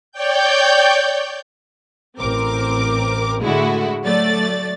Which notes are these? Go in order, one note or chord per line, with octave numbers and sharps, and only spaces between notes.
C#5 D5 G5 G6
A1 C4 A#4 D6
A2 D3 G#3 A3 E4 F#4
F#3 A3 D5 A6